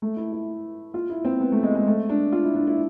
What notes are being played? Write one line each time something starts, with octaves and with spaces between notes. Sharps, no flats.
A3
E4
E4
F4
E4
C4
B3
A3
G#3
G#3
A3
D4
F4
E4
D4
E4